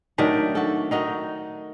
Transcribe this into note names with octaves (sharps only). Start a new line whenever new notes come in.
D#3 F#3 A3 D4
F#4 A4
D#3 D#4 F#4